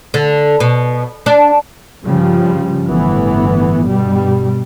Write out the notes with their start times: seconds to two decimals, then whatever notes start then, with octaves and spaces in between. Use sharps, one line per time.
0.14 D3
0.60 B2
1.26 D4
2.05 G2 C#3 F3 G3
2.88 G1 A2 E3 B3
3.87 G2 B2 G3